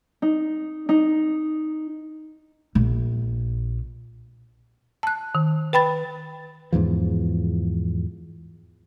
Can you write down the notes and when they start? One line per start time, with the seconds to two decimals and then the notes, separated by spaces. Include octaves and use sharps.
0.22 D#4
0.89 D#4
2.75 A#1
5.03 A5 F#6
5.35 D#3
5.73 B4 G5 B5 A6
6.72 E2 G#2 E3 F3